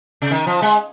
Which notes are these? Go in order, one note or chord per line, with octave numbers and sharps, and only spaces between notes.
C#3
D#3
F3
G#3